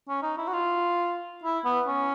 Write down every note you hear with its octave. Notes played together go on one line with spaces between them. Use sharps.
C#4
D#4
E4
F#4
F4
E4
B3
C#4